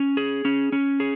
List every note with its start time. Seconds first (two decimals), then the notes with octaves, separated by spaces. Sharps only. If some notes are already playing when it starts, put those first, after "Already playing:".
Already playing: C#4
0.17 G#4
0.45 C#4
0.72 C#4
1.00 G#4